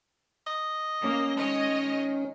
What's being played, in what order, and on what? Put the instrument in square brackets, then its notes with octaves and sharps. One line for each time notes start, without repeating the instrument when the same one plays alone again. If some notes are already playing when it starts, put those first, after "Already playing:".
[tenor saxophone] D#5
[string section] A#3 [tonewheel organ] C#4
[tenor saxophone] D#3 [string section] G#3 C#5 D#5